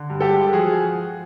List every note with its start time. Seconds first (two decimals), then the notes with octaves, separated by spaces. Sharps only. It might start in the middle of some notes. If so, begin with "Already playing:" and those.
Already playing: D3
0.10 G2
0.21 G4 A4
0.32 G#3
0.53 F3 F#4 G#4